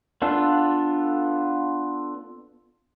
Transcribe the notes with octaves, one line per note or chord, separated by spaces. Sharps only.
B3 D4 F4 A4